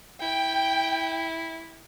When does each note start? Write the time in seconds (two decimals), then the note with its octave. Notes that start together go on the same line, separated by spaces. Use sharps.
0.22 E4 G5